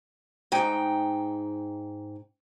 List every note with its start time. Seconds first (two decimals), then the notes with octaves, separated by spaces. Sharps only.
0.52 G#2 D#4 G5